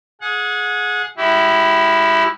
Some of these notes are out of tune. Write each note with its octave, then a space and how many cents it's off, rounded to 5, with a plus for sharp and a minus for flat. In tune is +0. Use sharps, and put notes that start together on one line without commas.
G#4 +15 F#5 -25
G#3 -25 E4 +0 G4 -40